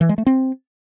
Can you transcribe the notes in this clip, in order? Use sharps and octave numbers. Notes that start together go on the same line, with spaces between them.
E3
G#3
A3
C4